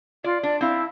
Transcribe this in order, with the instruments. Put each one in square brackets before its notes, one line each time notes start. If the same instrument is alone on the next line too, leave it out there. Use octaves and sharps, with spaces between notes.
[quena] F4 [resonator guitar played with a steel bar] D5
[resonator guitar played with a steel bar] D4 [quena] D5
[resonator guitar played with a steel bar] C4 F5 [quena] E4